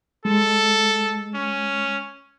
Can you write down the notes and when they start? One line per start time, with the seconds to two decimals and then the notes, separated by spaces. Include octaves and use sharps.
0.25 G#3 A4
1.35 C#4